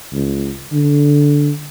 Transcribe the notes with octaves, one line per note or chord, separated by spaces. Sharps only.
C#2
D3